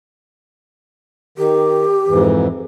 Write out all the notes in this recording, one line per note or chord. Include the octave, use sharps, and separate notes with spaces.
D#3 G4
F2 G#2 E3